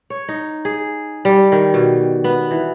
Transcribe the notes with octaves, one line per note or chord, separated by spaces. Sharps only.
C#5
D#4
G#4
G3
D#3
B2
B3
E3